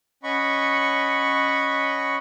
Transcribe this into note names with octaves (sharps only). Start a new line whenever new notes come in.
C#4 D#5 F#5 B5 C#6